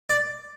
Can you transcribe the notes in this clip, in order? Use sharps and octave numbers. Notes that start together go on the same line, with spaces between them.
D5